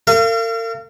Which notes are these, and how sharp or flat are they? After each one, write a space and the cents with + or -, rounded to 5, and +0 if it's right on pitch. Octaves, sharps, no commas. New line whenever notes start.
A#4 -45 F5 -35